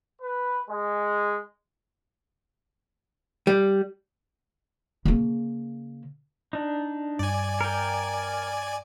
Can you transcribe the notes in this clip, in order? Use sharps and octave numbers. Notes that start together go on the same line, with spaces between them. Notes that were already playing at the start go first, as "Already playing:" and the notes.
B4
G#3
G3
C#3 A#3
D4 D#4
G2 D5 G#5
A#4 G5